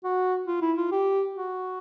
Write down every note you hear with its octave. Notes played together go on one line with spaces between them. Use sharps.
F#4
F4
E4
F4
G4
F#4